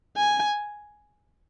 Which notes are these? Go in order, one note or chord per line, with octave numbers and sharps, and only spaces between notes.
G#5